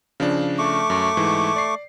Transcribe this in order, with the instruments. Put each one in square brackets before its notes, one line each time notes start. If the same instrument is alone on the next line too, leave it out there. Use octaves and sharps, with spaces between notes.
[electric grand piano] C#3 F3 D4
[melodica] A3 C#6 D6
[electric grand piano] F#2
G#2 E3
D5 C7